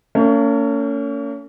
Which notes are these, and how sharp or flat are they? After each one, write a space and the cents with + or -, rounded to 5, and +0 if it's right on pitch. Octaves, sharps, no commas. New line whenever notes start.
A#3 -45 C#4 +25